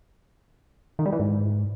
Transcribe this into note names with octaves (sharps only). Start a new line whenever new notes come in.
D#3
G3
E3
G#2